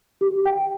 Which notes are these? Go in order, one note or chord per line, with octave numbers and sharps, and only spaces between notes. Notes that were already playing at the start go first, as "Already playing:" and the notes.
G4
G5